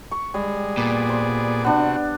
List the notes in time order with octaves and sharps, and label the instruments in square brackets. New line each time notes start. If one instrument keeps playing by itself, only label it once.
[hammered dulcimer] C#6
[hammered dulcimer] G3 [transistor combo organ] G#3
[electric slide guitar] A#2 [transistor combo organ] B3 G#4 D5
[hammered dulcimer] C5
[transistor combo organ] C3 F#4 [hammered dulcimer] B3 D4